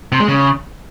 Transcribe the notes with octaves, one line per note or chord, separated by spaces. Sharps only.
C3
G#3
C#3